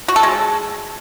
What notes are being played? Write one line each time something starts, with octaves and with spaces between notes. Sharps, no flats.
F#4
A4
G#3